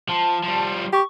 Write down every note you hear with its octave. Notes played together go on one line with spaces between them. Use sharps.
F3 A5
F3 G3
G4 C#6